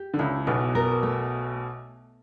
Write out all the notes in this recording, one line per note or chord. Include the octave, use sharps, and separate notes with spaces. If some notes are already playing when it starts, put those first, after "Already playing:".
Already playing: G4
D3
C#2 C#3 E4
B1 B2 B3
A#4
A3